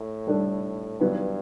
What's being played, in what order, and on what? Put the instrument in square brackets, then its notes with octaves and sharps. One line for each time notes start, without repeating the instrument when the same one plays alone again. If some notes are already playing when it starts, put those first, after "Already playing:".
Already playing: [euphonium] A2
[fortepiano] G3 D4 A4
[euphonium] G2 [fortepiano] F#3 B3 E4 B4